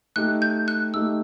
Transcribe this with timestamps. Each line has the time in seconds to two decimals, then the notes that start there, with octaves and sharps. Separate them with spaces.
0.16 A3 D#4 G4 F#6
0.42 G6
0.68 F#6
0.94 A3 D#4 G4 E6